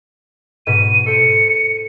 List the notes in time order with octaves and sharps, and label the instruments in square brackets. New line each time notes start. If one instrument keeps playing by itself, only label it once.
[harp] G#2 B2 B6 [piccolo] D#7
[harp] A4 C5 [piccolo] C#7